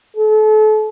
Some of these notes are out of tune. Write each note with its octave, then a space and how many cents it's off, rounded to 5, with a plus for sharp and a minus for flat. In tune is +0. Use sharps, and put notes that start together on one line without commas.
A4 -35